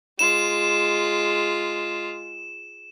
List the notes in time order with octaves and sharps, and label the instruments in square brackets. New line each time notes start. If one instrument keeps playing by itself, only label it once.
[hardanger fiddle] G#3 F4 [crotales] E7